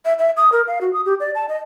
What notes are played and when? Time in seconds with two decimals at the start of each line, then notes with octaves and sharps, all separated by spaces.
0.05 E5
0.19 E5
0.37 D#6
0.52 A#4
0.67 F5
0.81 F#4
0.93 D#6
1.06 G4
1.20 D5
1.35 A5
1.49 D#5